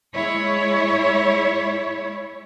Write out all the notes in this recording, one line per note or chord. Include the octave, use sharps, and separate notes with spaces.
G#3 E4 C#5